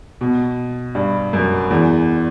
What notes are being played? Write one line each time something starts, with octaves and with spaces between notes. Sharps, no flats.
B2
G2
F#2
E2